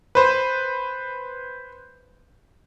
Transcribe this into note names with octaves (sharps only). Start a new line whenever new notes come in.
B4 C5